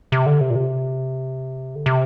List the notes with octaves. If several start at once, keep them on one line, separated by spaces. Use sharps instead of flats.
C3
D3
C3
A#2
C3
D3
C3